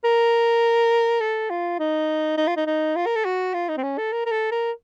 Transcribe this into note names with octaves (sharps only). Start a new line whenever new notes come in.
A#4
A4
F4
D#4
D#4
F4
D#4
D#4
F4
A#4
A4
F#4
F4
D#4
C4
C#4
A4
A#4
A#4
A4
A#4